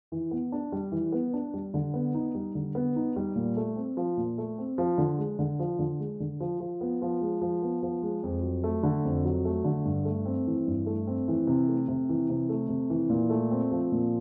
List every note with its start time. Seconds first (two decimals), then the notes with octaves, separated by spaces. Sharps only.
0.12 E3
0.31 B3
0.52 D4
0.72 G3
0.92 E3
1.12 B3
1.34 D4
1.54 G3
1.74 D3
1.94 B3
2.15 D#4
2.35 G3
2.55 D3
2.75 B3
2.96 D#4
3.16 G3
3.35 A#2
3.57 A3
3.76 C4
3.97 F3
4.17 A#2
4.38 A3
4.58 C4
4.78 F3
4.98 D3
5.18 G#3
5.39 D3
5.59 F3
5.79 D3
5.99 G#3
6.20 D3
6.40 F3
6.60 F3
6.81 B3
7.02 F3
7.21 G#3
7.42 F3
7.62 B3
7.83 F3
8.02 G#3
8.23 F2
8.43 F#3
8.64 A3
8.83 D3
9.05 F2
9.25 F#3
9.45 A3
9.64 D3
9.85 G2
10.05 A3
10.25 C4
10.47 E3
10.67 G2
10.86 A3
11.07 C4
11.28 E3
11.47 C3
11.68 A3
11.88 C3
12.09 E3
12.29 C3
12.49 A3
12.69 C3
12.90 E3
13.10 A#2
13.30 A3
13.51 C4
13.71 F3
13.92 A#2